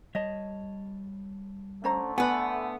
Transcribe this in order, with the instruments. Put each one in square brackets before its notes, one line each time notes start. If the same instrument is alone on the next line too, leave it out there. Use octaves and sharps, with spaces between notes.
[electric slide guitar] G3 C#5 A5 [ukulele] D#5
[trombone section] D3 A3 [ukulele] C#4 C5 A#5
[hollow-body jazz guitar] B3 B4 [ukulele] D5 G#5